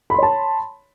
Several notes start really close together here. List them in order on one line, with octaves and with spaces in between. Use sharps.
B5 C6 C#5 A5